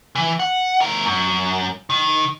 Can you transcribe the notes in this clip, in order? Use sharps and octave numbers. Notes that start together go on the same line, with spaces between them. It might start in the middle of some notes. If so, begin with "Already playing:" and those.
E3
F#5
A3 A#4
F#2
D#3